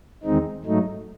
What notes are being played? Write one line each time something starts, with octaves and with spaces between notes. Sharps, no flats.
E2 D#3 G#3 C4 D#4
G#2 F#3 A3 D#4